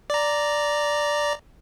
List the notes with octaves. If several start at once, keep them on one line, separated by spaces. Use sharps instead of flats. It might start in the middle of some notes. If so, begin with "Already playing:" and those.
D5 A#5